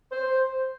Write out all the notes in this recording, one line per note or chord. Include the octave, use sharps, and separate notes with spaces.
C5